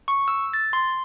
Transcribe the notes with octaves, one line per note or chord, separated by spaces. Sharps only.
C#6
E6
A6
C6